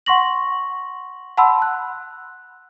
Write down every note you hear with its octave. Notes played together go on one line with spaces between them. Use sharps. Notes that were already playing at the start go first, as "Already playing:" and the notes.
F#5 C6 C#6 A#6 F#7
F#5 A5 B5 C6 E6
F#6